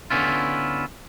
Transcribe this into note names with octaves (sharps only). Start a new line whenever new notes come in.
D3 B3 C#4 E4 F4